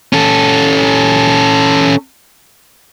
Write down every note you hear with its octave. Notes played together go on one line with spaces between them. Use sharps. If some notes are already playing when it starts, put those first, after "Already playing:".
C#4 A4